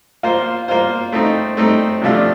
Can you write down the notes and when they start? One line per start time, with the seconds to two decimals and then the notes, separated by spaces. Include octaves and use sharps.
0.23 A#3 F4 C5
0.68 A#3 F4 C5
1.12 A3 C4 D#4
1.57 A3 C4 D#4
2.02 C3 F3 A3 D4 F4